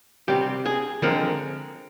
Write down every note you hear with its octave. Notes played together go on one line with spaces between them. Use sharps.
C3 G3 C4 G4
G#4
D3 F3 G#3 C4 A#4